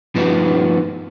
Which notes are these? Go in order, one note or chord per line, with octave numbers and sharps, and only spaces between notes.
G2 F3 B3 D#4